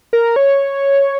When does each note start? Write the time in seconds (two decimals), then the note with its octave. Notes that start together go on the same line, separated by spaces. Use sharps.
0.13 A#4
0.36 C#5